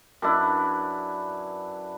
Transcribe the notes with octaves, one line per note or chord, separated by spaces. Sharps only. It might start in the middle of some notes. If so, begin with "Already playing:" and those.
F#2 D4 E4 B4